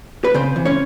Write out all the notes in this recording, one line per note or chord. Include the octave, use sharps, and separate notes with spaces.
B4
C#3 C4 C5
E3
C#4 C#5